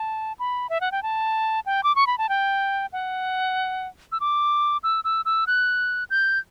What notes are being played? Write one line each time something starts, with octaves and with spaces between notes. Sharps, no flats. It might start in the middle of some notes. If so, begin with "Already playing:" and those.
Already playing: A5
B5
E5
F#5
G5
A5
G5
D6
C#6
B5
A5
G5
F#5
E6
D6
E6
E6
E6
F#6
G6